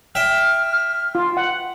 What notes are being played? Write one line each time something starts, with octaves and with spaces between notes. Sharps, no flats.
E5 G5 F6
F4
F#5